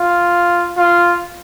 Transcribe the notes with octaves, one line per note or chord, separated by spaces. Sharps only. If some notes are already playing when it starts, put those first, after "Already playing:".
Already playing: F4
F4